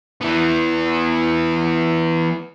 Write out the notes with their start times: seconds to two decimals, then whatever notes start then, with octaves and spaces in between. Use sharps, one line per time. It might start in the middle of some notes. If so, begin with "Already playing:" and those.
0.21 E3 B3